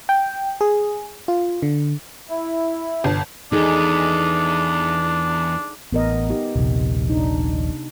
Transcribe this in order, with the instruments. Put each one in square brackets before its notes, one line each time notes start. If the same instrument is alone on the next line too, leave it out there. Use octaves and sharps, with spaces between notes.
[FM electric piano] G5
G#4
F4
D3
[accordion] E4
[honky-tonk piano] G1
[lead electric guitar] E2 [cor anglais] D4 [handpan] D#4 G#4 A4
[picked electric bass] A1 [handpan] B3 A#4 D#5
[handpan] D#4 G4
[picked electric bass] D#1 A#1 [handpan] C3
[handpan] D4 D#4